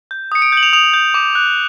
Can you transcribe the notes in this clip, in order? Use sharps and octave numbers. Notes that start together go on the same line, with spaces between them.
G6
D#6 C#7
D7
G6 F#7
F7
D#6 F7
G6
D6
F#6